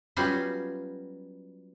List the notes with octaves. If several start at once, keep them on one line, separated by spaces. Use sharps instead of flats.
F#3 G3 B3 C#4 F4 F#4